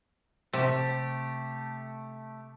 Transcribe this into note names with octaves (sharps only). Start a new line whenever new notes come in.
C3 A3 G4